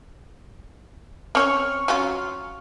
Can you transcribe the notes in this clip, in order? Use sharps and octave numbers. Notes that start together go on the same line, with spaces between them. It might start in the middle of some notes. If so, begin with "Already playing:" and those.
C4 C#4 C#5 C#6 F6
F#3 C#4 F4